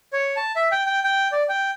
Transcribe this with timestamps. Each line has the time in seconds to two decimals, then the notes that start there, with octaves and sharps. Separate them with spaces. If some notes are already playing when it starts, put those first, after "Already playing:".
0.13 C#5
0.36 A5
0.56 E5
0.72 G5
0.86 G5
1.04 G5
1.32 D5
1.49 G5